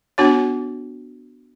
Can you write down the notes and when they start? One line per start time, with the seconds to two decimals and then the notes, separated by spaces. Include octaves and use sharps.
0.18 B3 D4 F#4 C#5